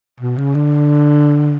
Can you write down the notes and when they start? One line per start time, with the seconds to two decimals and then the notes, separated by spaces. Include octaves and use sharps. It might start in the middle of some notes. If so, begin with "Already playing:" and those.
0.20 B2
0.38 C#3
0.55 D3